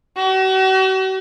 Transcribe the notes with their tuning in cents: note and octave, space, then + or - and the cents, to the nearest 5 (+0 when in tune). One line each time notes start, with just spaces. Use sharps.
F#4 +45